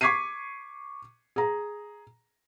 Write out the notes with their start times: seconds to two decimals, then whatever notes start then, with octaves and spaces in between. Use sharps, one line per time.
0.01 C#6 D6 G#6 B6 C7 D#7
1.36 G#4 A#5